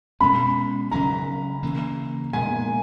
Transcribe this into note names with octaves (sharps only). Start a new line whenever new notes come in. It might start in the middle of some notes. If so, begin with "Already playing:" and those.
B2 G#3 C#4 B5
C#3 F#3 C#4 A#5
C#3 E3 A#3
A#2 G#3 B3 G#5